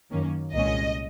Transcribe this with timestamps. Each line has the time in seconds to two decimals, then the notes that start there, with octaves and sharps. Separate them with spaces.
0.11 F#2 D#3 A#3 C#4
0.53 C2 A#2 G#3 C#4 D#5